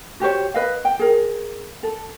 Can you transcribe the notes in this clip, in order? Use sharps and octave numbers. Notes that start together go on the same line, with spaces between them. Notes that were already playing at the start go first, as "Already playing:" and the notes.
F#4 G4 C5 C#5
B4 D#5 F5
G5
G#4 A#4
A4